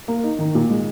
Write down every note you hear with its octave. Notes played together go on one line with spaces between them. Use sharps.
A#3
D#4
D#3
A#2
G#3